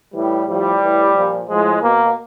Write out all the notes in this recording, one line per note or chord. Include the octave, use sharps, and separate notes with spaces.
A2 E3 G3
A2 F3 G3
A2 E3
A#2 F3
A2 F3 G#3
B2 A#3